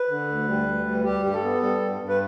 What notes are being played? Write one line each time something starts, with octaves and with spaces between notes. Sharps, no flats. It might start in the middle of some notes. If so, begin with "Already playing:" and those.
Already playing: B4
D3
D2
G3
D2
G3
G3 G4
G2 G4
A4
B3
G3 A4
G2
G2
B4